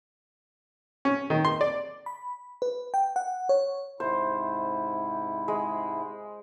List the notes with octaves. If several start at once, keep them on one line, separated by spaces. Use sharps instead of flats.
C#4
D#3
C6
D5
B5
B4
G5
F#5
C#5
G#2 C3 E4 C5
G#3